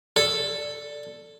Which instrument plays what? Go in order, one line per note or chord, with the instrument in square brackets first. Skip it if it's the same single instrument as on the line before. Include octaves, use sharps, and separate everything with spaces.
[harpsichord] A4 [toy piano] D5